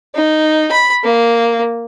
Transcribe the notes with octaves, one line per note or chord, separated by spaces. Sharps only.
D#4
B5
A#3